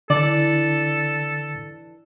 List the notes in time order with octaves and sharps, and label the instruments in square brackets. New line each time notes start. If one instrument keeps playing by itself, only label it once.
[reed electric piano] D3 [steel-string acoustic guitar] E3 D4 [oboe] A4 [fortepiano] D5